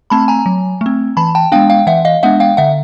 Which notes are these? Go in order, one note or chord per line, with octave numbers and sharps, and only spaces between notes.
A3 C4 A5 B5
G#5 A#5
F#3
A3 C4
E3 A5 B5
G5 A5
G#3 B3 D4 F5 G5
F5 G5
E3 E5 F#5
D#5 F5
G#3 B3 D4 E5 F#5
F5 G5
D3 E5 F#5